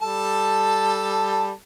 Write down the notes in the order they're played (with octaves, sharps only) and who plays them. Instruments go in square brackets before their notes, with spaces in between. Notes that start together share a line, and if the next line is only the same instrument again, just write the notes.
[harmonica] G3 A4 A5